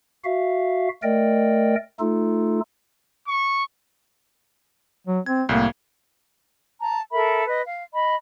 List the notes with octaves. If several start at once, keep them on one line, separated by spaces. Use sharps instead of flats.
F#4 E5 F5
A3 A#4 D5 D#5 G5
A3 D#4 F4 A4
C#6
F#3
C4 G#6
C2 A2 A#3
A5 A#5
A4 A#4 E5 B5
B4 D#5
F5
D#5 B5